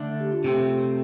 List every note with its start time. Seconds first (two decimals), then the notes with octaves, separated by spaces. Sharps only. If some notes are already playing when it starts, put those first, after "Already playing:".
Already playing: D3 A3 D4
0.20 G4
0.32 F4
0.44 C3 A3 C4 G4